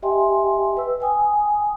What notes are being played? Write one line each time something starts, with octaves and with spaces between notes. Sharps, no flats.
G4 D#5 E5 G5 G#5 C6
B4 E6
G5 G#5 D#6